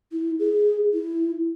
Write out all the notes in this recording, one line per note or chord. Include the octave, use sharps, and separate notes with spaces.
E4
G#4
E4